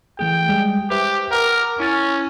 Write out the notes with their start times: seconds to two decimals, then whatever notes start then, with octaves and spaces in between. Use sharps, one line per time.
0.19 E3 A3 G#4 G5
0.49 G3 G#3 G#4
0.90 G4 B4 C5 E5
1.32 A#4 F#5 D6
1.80 C#4 E4 A6